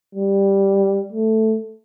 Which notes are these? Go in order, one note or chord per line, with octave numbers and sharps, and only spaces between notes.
G3
A3